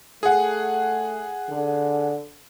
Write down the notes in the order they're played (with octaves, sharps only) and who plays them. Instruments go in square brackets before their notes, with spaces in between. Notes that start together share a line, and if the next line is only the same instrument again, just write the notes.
[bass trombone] A3 [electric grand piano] G#4 F#5
[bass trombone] D3